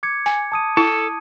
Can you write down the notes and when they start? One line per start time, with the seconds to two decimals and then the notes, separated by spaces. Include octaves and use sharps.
0.03 D6 G#6 C#7
0.26 G#5
0.52 A5 D#6 D#7
0.77 E4 A4